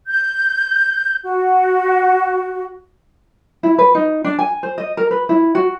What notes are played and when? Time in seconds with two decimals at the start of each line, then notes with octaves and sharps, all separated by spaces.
0.07 G6
1.24 F#4
3.63 E4
3.78 B4
3.95 D#4
4.24 D4
4.39 G#5
4.63 C5
4.78 D#5
4.97 A#4
5.11 B4
5.29 E4
5.55 F#4